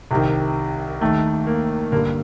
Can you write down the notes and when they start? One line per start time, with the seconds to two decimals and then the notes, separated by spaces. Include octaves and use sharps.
0.11 C2 C3 D#3
1.01 D#2 D#3 A3
1.47 A#3
1.92 G2 D3 A#3